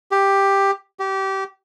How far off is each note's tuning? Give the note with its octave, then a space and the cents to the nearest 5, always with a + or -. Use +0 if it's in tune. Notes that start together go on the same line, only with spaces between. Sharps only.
G4 +5
G4 -25